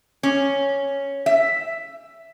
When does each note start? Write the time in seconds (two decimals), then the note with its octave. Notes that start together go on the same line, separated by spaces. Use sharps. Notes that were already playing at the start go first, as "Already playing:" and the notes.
0.23 C#4
1.26 E5